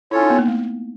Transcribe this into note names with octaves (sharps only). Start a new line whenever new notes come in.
C#4 E4 F4 A4 C#5
D#4
B3
A#3
A3